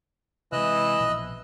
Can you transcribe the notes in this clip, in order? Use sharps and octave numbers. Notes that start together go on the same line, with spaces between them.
C3 E3 G#3 D#5 E6 F#6
A#1 B2 F3